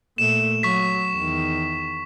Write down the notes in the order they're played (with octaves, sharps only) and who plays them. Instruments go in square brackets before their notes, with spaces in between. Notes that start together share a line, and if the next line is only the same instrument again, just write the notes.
[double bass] A#2 A3 [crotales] E7
[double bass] F#3 [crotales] C#6 B6
[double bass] E2 D#3